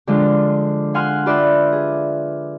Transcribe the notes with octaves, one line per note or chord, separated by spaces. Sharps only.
D3 F3 G#3 D4 F4 G4
F5 F#5 G#5 C6 F6
F4 G4 B4 D5 E5
G#4